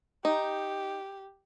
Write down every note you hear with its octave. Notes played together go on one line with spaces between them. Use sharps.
D#4 G4